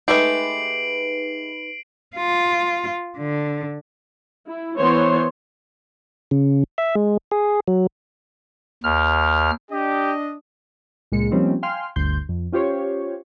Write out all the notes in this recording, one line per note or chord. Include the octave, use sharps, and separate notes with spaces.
G#3 A3 D#4 G4 B4 C7 D7 F#7
F4
D3
E4
E3 B3 C5 C#5 C6
C#3
E5
G#3
G#4
F#3
D#2 F6
D4 G4 D#5
C#2 A#2 G#3 A#3 C#7
F3 G3 A#3 C4 C#4 D#4
F5 G5 G#5 C6 F6
G1 D2 C6 G6
F2
C#4 F4 G4 C5 C#5